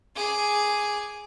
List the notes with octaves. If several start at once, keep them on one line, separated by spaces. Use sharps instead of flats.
G#4 D6